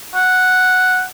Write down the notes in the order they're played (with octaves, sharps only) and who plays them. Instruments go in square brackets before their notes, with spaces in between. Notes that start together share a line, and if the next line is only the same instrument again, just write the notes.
[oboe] F#5